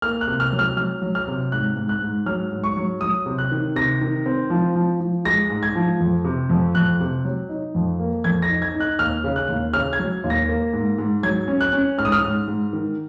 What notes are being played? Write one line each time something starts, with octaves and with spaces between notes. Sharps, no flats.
A#3 F6
F#6
C3
F6
F#3
F6
F#3 F6
F#3
F6
C3
G#2 F#6
G#2
F#6
G#2
F#3 F6
G#2
C#6
F#3
F#3 D#6
C3
F#6
D#3
C3 A#6
D#3
C4
F3
F3
F3
G#3 A#6
G#2
G#6
F3
F2
C3
F2
F2 F#6
C3
F#3
D#4
F2
A#3
F2 G#6
A#6
D#4
G#6
D#4
F#6
D#2 F6
C#3
F#6
D#2
C#3 F6
G#6
F#3
D#2
A#6
A#3
G#2
G#2
F#3 G#6
C#4
F#6
C#4
G#2 F6
D#6
F6
G#2
G#2
D#3